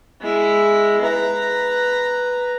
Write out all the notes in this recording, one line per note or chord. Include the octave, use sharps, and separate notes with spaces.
G#3 E4
B4 A#5